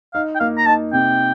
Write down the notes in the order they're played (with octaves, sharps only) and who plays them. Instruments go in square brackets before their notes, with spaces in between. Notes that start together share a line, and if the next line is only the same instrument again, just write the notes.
[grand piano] D#4 [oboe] F5
[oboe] G5
[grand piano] A#3 [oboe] F5
[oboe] A#5
[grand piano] D#4 [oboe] A5
[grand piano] C3 [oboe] G5